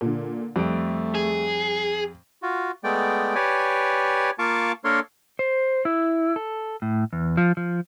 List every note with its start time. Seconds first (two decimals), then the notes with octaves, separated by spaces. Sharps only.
0.01 A#2 D3
0.56 F2 G3 A3 D7
1.15 G#4
2.43 F4 F#4
2.84 G#3 A3 B3 D5 G5
3.35 G4 B4 C#5 D5 G#5
4.39 A#3 F4 F5 A5 C#6 D6
4.84 A#3 D4 A4 A#4 C#5 C6
5.39 C5
5.85 E4
6.36 A4
6.82 A2
7.13 E2
7.37 F3
7.57 F3